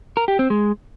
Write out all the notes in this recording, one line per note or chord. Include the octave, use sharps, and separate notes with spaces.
A#4
G4
C4
G#3